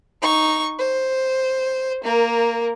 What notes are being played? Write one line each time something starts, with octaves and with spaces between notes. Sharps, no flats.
D#4 C#6
C5
A#3 A#4